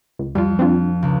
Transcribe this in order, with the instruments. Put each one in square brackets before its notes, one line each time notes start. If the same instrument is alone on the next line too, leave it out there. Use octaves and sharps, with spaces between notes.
[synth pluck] C#2
[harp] F2 [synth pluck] G3 F4
[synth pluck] C4 D4 F4
[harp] C#2